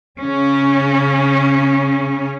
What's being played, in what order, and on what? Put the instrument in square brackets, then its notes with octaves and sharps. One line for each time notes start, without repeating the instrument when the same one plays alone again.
[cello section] C#3 C#4